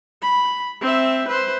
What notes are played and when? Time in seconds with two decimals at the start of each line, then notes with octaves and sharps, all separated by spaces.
0.22 B5
0.81 C4 E5
1.27 B4 C5